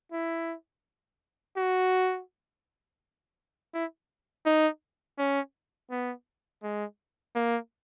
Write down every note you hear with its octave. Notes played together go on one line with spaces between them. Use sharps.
E4
F#4
E4
D#4
C#4
B3
G#3
A#3